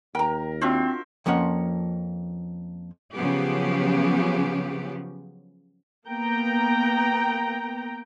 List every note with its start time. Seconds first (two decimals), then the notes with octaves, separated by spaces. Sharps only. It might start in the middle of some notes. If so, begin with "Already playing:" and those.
0.15 D#2 A#4 G5 A#5
0.61 C4 D4 F4 F#4 C5 E5
1.26 F2 F3 A#3 C#4 F#5
3.14 C#3 F3 F#3 B3 G4
6.07 A#3 B3 G5 A#5